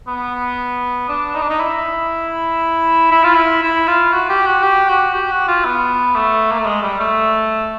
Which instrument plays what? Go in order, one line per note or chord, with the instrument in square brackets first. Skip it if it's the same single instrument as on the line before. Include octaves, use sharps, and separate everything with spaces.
[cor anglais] B3
D4
D#4
D4
D#4
E4
E4
F4
E4
E4
F4
F#4
G4
F#4
G4
F#4
G4
F#4
F4
B3
A3
A#3
A3
G#3
G3
A3